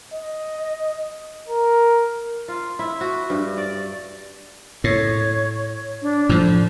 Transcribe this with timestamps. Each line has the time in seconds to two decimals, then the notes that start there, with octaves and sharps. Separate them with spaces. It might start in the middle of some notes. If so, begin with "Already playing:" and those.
0.14 D#5
1.48 A#4
2.48 F4
2.79 E4
3.01 F#4
3.30 G2
3.58 D5
4.84 A2 C#5
6.02 D4
6.29 A2 F3